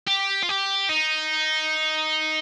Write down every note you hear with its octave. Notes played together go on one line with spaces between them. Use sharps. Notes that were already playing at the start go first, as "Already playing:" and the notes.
G4
F4
G4
D#4